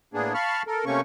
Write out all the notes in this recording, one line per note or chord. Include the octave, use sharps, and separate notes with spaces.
A2 A#3 B3 D4 G#4
F5 A5 B5 C#6 F6
A4 A#4
C3 A3 A#3 C#4 C#6